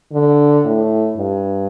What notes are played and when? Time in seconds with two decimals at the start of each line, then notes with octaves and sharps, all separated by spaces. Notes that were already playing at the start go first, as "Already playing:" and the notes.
0.13 D3
0.65 A2
1.18 G2